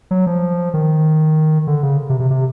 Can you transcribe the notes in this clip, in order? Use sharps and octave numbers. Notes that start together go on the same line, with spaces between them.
F#3
F3
D#3
D3
C#3
C3
C3
C3